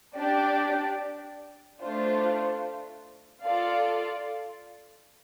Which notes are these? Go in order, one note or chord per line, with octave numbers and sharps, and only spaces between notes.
D4 G4 D5
A3 D4 F4 C5
F4 A4 D5 F5